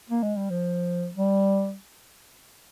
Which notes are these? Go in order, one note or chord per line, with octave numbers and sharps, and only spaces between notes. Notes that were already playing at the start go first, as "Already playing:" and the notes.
A#3
G#3
G3
F3
G3